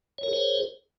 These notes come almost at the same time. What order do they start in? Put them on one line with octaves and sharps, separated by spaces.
C#5 A#4 G#4 C5